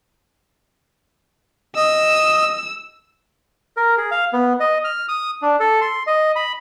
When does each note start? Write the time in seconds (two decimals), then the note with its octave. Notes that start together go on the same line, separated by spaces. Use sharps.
1.76 D#5 E6
3.77 A#4
3.97 G#4
4.11 F5
4.33 B3
4.60 D#5
4.84 F6
5.09 D#6
5.42 D4
5.60 A4
5.81 C6
6.07 D#5
6.36 B5